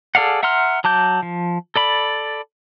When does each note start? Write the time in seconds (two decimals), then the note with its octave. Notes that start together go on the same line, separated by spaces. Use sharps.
0.15 G#4 A4 D5 F5 F#5
0.43 E5 F#5 A#5 C6 F6
0.84 F#3 A5 D6 G6
1.23 F3
1.76 A4 D5 B5